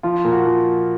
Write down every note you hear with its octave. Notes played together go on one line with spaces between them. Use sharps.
F3 F4
A#2
F#4
F3